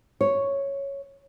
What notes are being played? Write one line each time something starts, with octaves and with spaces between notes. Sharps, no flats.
C#5